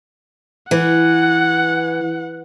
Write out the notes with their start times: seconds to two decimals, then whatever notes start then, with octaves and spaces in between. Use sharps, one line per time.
0.71 E3 F#5